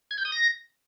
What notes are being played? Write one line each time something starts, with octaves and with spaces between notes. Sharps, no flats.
G#6
G6
D#6
A#6